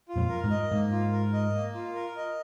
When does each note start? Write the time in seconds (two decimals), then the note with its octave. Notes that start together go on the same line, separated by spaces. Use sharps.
0.09 F4
0.16 F2 A#2
0.29 A#4
0.44 G#2
0.50 D#5
0.71 G#2 A#3
0.91 F4
1.12 A#4
1.33 D#5
1.55 A#3
1.75 F4
1.95 A#4
2.16 D#5